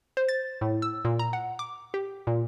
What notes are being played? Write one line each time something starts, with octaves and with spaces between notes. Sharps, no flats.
C5
A6
A2
E6
A#2
A#5
F#5
D6
G4
A#2